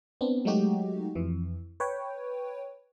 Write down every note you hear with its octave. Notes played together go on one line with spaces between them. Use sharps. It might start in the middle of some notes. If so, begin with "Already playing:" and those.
B3 C4 D4
F#3 G#3 A3 D#4 F#4 G4
F2 E3
B4 C#5 G5